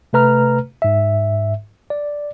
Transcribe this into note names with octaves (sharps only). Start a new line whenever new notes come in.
C3 A3 B4 A#5 F6
G#2 E5
D5